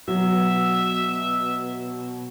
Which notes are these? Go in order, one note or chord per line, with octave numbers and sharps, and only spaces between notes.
B2 F#3 E5